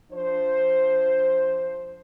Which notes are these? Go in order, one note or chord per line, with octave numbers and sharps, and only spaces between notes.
F3 D4 C5